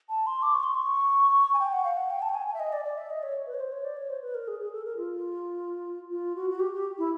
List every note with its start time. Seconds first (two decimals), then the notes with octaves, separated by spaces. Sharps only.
0.09 A5
0.27 C6
0.42 D6
0.54 C#6
0.63 C6
0.74 C#6
1.53 G#5
1.59 G5
1.73 F#5
1.84 F5
1.97 F#5
2.10 G5
2.22 A5
2.29 G5
2.35 G#5
2.47 G#5
2.54 E5
2.60 D#5
2.73 D5
2.85 D5
2.98 E5
3.10 D#5
3.23 C#5
3.47 B4
3.54 C#5
3.60 C5
3.72 C#5
3.85 D5
3.97 C#5
4.10 C5
4.22 B4
4.34 A#4
4.48 G#4
4.60 G#4
4.72 A4
4.85 A#4
4.97 F4
6.10 F4
6.36 F#4
6.50 F#4
6.60 G4
6.73 G4
6.98 E4